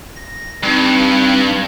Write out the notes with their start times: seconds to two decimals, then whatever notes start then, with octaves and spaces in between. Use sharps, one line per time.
0.16 A#6
0.63 G2 G3 C4 D#4